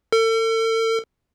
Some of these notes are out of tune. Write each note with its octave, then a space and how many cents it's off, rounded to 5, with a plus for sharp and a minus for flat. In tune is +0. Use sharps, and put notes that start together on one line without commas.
A4 +40